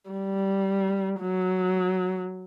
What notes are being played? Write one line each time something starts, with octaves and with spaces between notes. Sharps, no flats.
G3
F#3